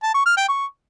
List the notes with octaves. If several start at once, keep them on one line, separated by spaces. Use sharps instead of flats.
A5
C#6
F6
G5
C#6